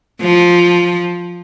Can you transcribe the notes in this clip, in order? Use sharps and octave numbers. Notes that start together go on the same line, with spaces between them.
F3